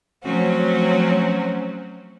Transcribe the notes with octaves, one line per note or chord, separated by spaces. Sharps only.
F3 F#3 A3 C4 C#4 F#4